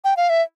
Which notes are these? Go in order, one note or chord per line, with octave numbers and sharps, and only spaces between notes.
G5
F5
E5